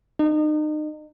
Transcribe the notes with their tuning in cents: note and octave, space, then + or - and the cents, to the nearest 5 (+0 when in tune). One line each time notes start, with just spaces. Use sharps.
D#4 -35